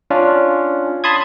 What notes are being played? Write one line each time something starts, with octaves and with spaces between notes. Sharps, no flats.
C#4 D4 F4
A5 B5 C6 D#6 G#6